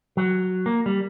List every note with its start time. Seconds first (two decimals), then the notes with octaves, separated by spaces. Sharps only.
0.17 F#3
0.66 A#3
0.86 G3